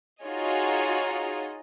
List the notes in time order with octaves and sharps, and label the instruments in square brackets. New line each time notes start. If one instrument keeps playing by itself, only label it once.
[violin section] D#4 F4 F#4 G#4 C#5 D#5